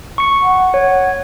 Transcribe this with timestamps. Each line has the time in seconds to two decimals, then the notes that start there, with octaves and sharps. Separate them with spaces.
0.18 C#6 C#7
0.42 F#5
0.74 C#5